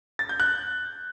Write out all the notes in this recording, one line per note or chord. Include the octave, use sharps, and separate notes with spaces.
A6
G6
F#6